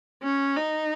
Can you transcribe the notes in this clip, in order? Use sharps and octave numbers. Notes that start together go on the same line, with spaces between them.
C#4
D#4